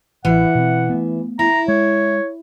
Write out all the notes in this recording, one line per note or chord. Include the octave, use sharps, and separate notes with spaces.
A1 E3 E5 F#5
B2 C4
A3 B3
E4 A#5
G#3 C#5